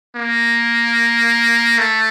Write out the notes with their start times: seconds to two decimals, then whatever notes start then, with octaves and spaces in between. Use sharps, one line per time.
0.16 A#3
1.78 A3